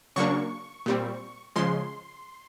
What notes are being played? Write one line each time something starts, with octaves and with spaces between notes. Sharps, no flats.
C#3 F#3 A#3 D4 C#6
A#2 G3 C4
C#3 F3 G#3 C6